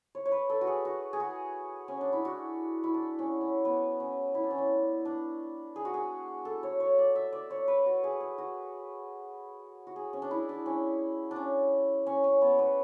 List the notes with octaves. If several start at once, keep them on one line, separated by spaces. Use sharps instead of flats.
C#5
C#5
B4
A4
F#4
G#4
F#4
G#4
F#4
C#4
D4
E4
F#4
E4
D4
C#4
C#4
B3
C#4
E4
D4
C#4
D4
D4
G#4
F#4
G#4
A4
C#5
C#5
D5
E5
D5
C#5
B4
F#4
G#4
G#4
F#4
F#4
G#4
C#4
D4
E4
D4
C#4
D4
C#4
C#4
C#4
B3
B3